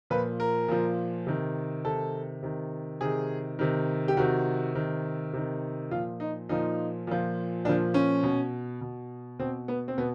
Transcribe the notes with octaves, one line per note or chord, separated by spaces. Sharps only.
A#2 F3 B4
A#4
A#2 F3
C3 D#3
C3 D#3 A4
C3 D#3
C3 D#3 G#4
C3 D#3
G4
C3 D#3 F#4
C3 D#3
C3 D#3
A#2 F3 F4
D#4
A#2 F3 D#4
A#2 F3
A#2 F3 D4
C#4
B2
B2
B2 C4
B3
C4
B2 B3